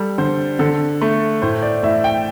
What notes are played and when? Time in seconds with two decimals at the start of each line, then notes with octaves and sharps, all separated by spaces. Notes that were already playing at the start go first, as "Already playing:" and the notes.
Already playing: G3 A4
0.18 D3 C5
0.59 D3 A4
1.01 A3
1.42 A2 C5
1.62 D5
1.83 A2 E5
2.04 G5